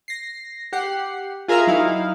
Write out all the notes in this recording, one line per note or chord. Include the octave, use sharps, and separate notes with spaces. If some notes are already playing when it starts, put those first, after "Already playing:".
A#6 C7
G4 F#5 C7
F4 G#4 A#4 E5 F5 A#5
F#3 D#4 E4 F5